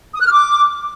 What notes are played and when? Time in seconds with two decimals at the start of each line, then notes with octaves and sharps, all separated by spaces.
0.15 D#6
0.20 F#6
0.26 F6
0.32 D6